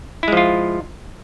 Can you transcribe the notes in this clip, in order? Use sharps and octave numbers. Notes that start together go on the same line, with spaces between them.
F3 G#3 E4 F4